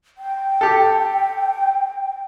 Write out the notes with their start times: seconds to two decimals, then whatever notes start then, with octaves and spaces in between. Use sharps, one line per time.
0.18 G5
0.61 G4 A4